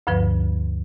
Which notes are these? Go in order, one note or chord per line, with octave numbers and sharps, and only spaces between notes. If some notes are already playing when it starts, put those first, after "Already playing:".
D2 G2 D3 F3 B4